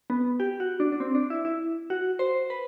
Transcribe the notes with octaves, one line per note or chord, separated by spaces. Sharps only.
B3
G4
F#4
D4
D4
C4
D4
E4
E4
F#4
C5
B4